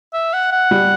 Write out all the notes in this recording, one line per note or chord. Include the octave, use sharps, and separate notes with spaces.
E5
F#5
F#5
G3